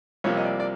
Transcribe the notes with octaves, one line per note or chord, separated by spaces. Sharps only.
C2 C3 F3 A#3 C#5
D#5
D5
D5